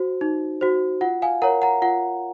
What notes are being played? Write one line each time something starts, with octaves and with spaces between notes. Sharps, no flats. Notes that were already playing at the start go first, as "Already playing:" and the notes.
Already playing: F#4 C5
D#4
F#4 C5
F4 F#5
F5 G#5
A#4 C#5 F#5 A#5
F#5 A#5
F4 F#5